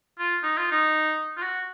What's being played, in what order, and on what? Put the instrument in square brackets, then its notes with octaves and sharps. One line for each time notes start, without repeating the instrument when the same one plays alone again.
[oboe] F4
D#4
F4
D#4
F4
F#4